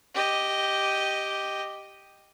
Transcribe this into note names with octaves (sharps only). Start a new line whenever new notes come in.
G4 D#5